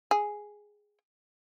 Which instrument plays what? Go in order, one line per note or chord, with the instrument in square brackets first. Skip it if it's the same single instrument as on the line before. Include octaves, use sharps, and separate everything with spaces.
[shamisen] G#4